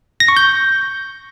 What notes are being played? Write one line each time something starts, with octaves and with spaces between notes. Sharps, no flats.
A#6
C#6
G6